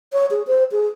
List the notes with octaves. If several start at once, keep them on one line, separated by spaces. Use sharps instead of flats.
C#5
G#4
C5
G#4